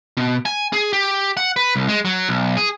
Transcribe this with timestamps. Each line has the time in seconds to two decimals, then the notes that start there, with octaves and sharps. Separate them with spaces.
0.17 B2
0.45 G#5
0.73 G#4
0.93 G4
1.37 F#5
1.56 B4
1.76 C2
1.88 G#3
2.05 F#3
2.29 B1
2.57 G#4